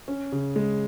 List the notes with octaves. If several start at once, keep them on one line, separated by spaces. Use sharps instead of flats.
C#4
C#3
G#3